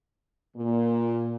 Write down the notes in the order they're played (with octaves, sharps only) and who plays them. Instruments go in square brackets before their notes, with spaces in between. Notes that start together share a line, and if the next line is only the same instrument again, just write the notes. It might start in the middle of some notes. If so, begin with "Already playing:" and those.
[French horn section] A#2